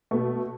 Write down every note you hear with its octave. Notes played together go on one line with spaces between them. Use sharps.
B2 A3